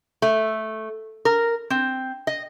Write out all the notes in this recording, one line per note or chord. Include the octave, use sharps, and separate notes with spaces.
A3
A#4
C4
D#5